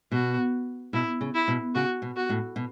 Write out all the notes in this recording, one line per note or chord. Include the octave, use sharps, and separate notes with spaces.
B2 F#4
B2 E4
C#3
E4
B2
C#3 F#4
B2
F#4
A2
B2